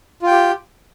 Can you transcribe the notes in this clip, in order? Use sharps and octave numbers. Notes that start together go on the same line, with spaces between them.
F4 G4 G5